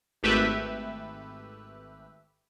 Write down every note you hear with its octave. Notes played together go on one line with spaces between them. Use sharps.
G#1 A3 G4 B4 E5